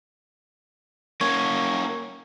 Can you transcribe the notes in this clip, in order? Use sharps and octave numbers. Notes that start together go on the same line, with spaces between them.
A#3 C#4 C#6 G#6